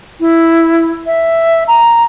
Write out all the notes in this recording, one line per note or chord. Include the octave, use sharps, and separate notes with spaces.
E4
E5
A#5